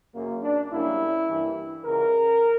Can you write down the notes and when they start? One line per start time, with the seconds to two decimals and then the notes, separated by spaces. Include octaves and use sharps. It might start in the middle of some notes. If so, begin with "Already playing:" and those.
0.14 F#2 C#3 F#3 A#3
0.43 D4
0.71 F#2 C#3 G3 A#3 E4
1.27 G2 E3 A#3
1.84 C#2 C#3 E3 A#4